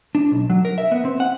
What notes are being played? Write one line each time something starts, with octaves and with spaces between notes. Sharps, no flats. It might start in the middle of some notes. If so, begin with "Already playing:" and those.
D4
B1
F#3
A#4
E5
B3
C4
F#5